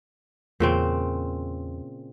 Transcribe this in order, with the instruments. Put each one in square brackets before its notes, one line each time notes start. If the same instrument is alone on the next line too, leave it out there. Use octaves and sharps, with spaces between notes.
[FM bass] E2 [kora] A#2 C#3 C4